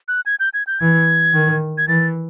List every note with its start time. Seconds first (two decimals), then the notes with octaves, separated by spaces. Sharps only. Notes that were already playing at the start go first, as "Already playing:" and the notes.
0.08 F#6
0.26 G#6
0.40 G6
0.54 G#6
0.67 G6
0.80 E3 G#6
1.34 D#3
1.78 G#6
1.88 E3 A6